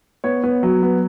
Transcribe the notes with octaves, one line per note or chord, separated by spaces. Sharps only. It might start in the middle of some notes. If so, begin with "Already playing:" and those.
B3 C#5
B3
F#3
B3